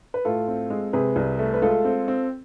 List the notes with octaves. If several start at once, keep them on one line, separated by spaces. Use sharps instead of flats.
B4
A2 F4 A4
C4
G#3
C3 G#4 B4
C2
A3
B4
G#3 F4 A4
C4
C4